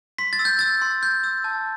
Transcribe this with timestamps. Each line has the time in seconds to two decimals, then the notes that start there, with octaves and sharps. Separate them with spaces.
0.18 C6 B6
0.33 A6
0.39 E6
0.45 G6
0.59 E6 A6
0.82 C6
1.03 G6
1.24 E6
1.44 A5